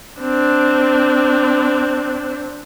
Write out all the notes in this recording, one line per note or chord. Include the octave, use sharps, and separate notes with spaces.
C4 D4